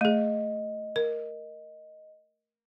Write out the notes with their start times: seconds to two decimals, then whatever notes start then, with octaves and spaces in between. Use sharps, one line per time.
0.01 A3 G#4 D#5
0.96 A#4